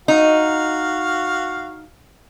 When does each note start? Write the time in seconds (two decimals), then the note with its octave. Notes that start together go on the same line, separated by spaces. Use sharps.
0.08 D#4 F#4 F5